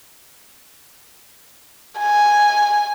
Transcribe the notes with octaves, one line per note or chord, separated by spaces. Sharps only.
G#5